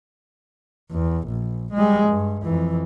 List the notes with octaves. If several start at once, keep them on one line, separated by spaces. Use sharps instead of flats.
E2
A#1
G3 G#3
G2
F2 E3